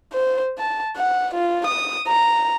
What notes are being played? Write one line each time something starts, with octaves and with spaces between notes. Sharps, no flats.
C5
A5
F#5
F4
D#6
A#5